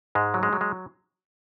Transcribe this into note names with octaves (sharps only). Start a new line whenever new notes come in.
G#2 G#3
F#3
G#3
F#3
G#3